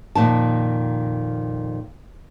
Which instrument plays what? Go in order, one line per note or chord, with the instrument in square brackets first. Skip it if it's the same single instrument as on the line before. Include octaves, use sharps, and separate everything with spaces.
[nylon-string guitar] F2 A#2 D#3 A5